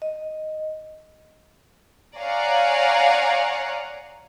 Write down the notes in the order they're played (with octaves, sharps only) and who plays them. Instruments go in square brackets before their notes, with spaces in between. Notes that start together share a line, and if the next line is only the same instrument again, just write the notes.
[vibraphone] D#5
[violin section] C#5 D5 F5 F#5 G#5 A#5